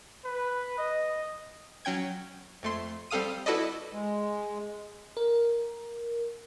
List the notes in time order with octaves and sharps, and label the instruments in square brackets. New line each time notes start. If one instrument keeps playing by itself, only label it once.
[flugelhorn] B4
D#5
[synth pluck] F#3 C#4 G5 G#6
F2 A3 C6
G3 C4 A4 F5 D#6 D#7
E4 F#4 A4 B4 D5 D#5
[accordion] G#3
[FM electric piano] A#4